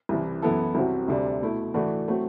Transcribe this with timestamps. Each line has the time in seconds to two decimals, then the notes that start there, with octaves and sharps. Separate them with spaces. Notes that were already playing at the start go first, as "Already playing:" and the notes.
0.09 C2 C3 E3
0.42 F#2 E3 B3 E4 A4
0.75 C2 C3 F#3 C4 F#4
1.08 D2 C3 G3 D4
1.41 B2 A3 E4
1.74 A2 E3 A3 D4 F#4
2.08 F#3 A3 C4 F#4